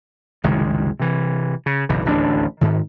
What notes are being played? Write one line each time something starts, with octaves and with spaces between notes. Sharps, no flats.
F#1 C2 D#3 G#3
C3 E3
C#3
F#1 B1 E3
D1 A1 D#2 D4
G#2 D#3